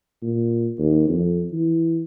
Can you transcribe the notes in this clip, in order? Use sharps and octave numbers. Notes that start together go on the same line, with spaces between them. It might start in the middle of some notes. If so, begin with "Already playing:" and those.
A#2
D#2
F2
E3